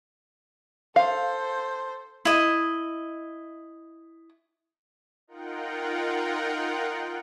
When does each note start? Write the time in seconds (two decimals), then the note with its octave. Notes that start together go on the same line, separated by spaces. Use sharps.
0.96 A4 C5 F5
2.25 E4 D#5
5.27 D#4 F4 A#4 F#5 G5